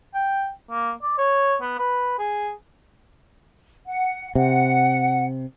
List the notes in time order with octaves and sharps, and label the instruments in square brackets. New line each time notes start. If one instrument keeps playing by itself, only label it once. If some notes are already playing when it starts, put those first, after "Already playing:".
[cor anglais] G5
A#3
D5
C#5
B3
B4
G#4
[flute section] F#5
[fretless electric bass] C3 [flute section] F#5